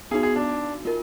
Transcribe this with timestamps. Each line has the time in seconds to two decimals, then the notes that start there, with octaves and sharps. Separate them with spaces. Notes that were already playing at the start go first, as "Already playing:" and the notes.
0.11 B3 D#4 F#4 G#4
0.23 G#4
0.36 D4
0.85 A#3 F4 A#4